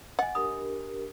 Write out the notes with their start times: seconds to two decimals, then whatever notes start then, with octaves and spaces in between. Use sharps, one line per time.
0.19 D#5 F#5 G#5
0.35 D4 G4 A#4 B5 D#6